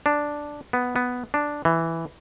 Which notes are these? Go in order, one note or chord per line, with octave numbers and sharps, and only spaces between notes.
D4
B3
B3
D4
E3